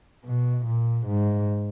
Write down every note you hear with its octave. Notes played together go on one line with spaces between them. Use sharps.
B2
A#2
G#2